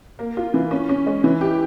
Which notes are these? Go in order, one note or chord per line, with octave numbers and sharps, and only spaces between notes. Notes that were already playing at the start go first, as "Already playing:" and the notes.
A#3
F4
E3
C#4
C#4
G#3
E3
G4